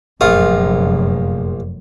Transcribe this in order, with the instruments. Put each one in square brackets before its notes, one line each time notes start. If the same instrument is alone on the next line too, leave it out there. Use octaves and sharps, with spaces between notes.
[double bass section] F1 F#2 [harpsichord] A#1 F4 D#6